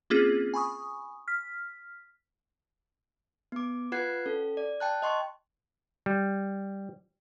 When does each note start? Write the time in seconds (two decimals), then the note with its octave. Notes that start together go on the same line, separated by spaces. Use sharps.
0.10 A#3 C4 C#4 F4 G#4
0.54 G#5 B5 C#6 D#6
1.28 F6 B6
3.52 B3 D6
3.92 F4 B4 F#5 F#6 G#6 C7
4.26 C#4 A4
4.57 D5
4.80 G5 A5 F#6
5.02 D#5 C6 C#6
6.06 G3